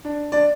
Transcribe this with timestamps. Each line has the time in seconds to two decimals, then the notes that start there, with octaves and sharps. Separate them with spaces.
0.05 D4
0.32 D4 D5